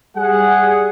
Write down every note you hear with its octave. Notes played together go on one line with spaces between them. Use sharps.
G3 G#4 F#5